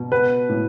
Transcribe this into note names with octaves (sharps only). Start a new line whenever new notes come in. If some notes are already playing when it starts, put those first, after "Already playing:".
Already playing: B2
B3 B4
A2